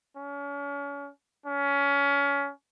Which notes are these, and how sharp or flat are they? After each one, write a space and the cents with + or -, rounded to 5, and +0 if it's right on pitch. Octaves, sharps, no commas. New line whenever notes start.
C#4 +35
C#4 +25